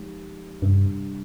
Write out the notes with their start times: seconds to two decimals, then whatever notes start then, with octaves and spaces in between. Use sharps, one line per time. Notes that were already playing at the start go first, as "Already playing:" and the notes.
Already playing: F3 G#3 D#4 G4
0.62 G2 C3 G3 D4